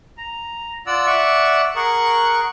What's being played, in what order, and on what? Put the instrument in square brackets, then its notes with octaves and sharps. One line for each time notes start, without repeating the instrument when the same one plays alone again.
[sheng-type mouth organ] A#5
F4 D5 F#5 E6
D5 E5 F#5 C#6
G#4 A#4 F#5 C#6